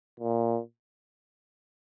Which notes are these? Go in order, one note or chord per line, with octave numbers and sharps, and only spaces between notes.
A#2